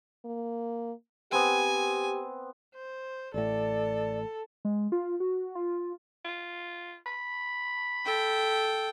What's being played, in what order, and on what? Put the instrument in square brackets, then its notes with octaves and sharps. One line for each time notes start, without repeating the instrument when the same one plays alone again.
[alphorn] A#3
[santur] B3 C4 [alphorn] G4 [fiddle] G#5
[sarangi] C5
[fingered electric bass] A1 A2 [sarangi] A4 [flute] D5
[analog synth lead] G#3
F4
F#4
F4
[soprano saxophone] F4
B5
[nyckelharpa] A4 G5